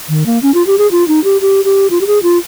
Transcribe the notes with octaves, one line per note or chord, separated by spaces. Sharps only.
D#3
A#3
C#4
F4
G4
G#4
F4
D#4
G4
G4
G4
F4
G4
G#4
F4